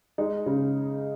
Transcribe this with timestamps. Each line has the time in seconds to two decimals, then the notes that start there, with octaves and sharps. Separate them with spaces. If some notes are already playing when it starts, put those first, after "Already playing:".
0.18 G#3 D#4
0.46 C#3